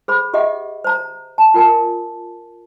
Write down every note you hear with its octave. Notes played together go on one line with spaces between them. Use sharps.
G#4 C5 B5
G4 G#4 D#5 E5 F#5
C5 A#5
A5
F4 A#4 G#5 A5